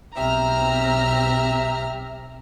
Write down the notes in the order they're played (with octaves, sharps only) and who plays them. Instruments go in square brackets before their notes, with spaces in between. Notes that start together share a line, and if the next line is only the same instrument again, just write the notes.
[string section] B1 C4 F6 [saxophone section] G4 E5 [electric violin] A#5